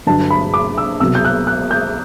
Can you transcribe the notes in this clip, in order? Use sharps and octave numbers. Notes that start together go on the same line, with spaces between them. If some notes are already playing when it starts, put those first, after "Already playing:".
G2 D3 F#3 A5
B5
D6
E6
C2 B2 F#3 E6
G6
F#6
F#6
G6